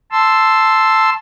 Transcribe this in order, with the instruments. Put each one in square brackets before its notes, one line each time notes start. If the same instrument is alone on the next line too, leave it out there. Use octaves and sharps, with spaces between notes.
[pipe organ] A5 C6 E6